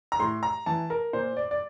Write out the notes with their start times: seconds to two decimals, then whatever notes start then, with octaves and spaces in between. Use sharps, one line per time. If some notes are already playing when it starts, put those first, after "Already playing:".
0.12 A#5
0.19 A2 C6
0.43 A#5
0.66 E3 A5
0.90 A#4
1.13 A#2 C5
1.37 D5
1.51 D5